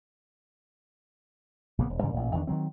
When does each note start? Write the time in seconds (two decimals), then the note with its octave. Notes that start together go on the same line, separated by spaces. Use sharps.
1.78 A#1 C#3 A#3 B3
1.90 E1
2.02 G2 C#3 E3 G3
2.14 A1 A#2
2.33 E2 D#3 D4
2.47 D#3 E3 F#3 C4